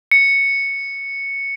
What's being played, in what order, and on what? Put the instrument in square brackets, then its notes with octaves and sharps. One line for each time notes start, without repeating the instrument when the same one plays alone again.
[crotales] C#7